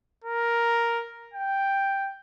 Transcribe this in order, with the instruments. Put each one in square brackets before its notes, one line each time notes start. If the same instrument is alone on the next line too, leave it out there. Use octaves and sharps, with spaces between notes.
[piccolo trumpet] A#4
G5